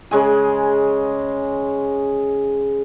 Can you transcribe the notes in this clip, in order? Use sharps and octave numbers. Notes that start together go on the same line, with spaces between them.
C#3 G#3 G#5